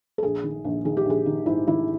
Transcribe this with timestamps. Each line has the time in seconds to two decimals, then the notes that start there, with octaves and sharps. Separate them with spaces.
0.18 A4
0.23 A#1 G#4
0.44 D#3
0.64 A#1
0.85 D#3 G#4
0.97 G4
1.05 A#1 G#4
1.26 D#3
1.46 G#2 E4
1.67 D#3 E4